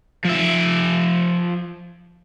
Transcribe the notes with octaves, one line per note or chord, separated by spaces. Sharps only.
F3 E5